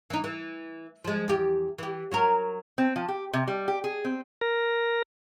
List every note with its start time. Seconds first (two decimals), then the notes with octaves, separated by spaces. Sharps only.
0.10 E3 D#4
0.24 E3
1.04 F3 G#3
1.28 E2 G4
1.78 E3 G4
2.12 F#3 F#4 A#4
2.78 C4
2.96 F3
3.08 G4
3.33 C3
3.48 G3
3.68 G4
3.84 G#4
4.05 C4
4.41 A#4